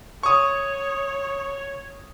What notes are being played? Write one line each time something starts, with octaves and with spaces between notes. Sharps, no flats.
C#5 C#6 D#6